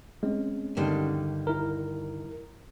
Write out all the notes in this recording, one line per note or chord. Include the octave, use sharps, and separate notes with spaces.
G#3 C4 C#4
G2 D3 D#3
E4 A#4